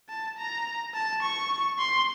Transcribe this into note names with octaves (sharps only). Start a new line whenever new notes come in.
A5
A#5
A5
C#6
C6